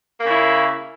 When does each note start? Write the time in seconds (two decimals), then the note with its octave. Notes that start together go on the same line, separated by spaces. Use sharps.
0.20 A#3
0.24 C#3
0.29 E4